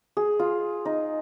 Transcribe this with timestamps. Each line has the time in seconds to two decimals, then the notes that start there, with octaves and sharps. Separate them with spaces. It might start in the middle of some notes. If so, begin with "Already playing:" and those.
0.17 G#4
0.39 F4
0.85 D#4